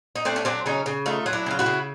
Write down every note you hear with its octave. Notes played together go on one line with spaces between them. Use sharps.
D#4
A3 C4 D4
C#4
F#3 C4 D4
C#3 C#4 D#4
C#3
A3 D#4 F4
F#3
D4 E4
C#3 F4
E4 F#4
C#3